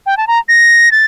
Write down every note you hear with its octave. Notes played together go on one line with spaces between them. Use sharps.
G5
A5
A#5
A#6
A6